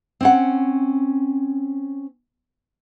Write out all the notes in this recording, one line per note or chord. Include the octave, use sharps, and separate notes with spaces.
C4 C#4 F#5